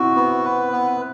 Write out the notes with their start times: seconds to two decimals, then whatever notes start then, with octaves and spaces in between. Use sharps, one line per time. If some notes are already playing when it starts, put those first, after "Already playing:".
Already playing: C4 E4 F#4
0.16 B3
0.45 B4
0.72 B3